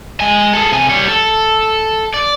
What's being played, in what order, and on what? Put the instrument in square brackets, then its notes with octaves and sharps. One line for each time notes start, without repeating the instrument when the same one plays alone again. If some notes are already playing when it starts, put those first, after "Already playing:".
[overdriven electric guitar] G#3 G#5
G#4 A4
C3 G#5
G3 C#5
A4
D5